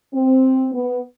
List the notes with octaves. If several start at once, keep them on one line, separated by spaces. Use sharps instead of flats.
C4
B3